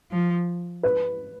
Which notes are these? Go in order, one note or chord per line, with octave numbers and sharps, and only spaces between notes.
F3
B4